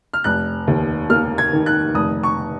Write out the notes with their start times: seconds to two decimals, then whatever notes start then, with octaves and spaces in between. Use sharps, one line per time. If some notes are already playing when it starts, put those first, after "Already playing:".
0.14 F6
0.24 F1 F#6
0.67 D#2
1.10 A#3 F6
1.38 G#6
1.53 D#3
1.66 F#6
1.95 F1 D#6
2.23 C#6